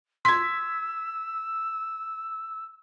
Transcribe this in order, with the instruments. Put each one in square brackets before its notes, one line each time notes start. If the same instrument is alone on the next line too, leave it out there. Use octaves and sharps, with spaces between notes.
[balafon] C6 [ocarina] E6 [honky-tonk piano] G#6 B6